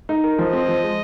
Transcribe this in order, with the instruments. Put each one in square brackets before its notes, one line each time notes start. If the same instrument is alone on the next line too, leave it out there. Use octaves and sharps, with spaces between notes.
[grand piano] D#4
A#4
[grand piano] F3 [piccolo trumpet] D#5
[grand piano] C4
F3
G#3